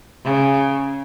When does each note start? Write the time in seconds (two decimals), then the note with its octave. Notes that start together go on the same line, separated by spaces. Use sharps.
0.25 C#3